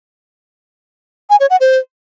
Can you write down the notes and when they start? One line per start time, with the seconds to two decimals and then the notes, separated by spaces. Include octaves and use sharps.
1.30 G#5
1.40 C#5
1.50 F#5
1.60 C5